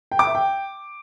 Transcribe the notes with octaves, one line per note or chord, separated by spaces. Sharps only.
G5
D6
E5
G5